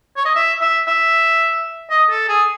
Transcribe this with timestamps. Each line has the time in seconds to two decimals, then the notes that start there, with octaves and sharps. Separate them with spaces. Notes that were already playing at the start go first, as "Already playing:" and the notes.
0.17 C#5
0.25 D#5
0.36 E5
0.61 E5
0.88 E5
1.90 D#5
2.10 A4
2.29 G#4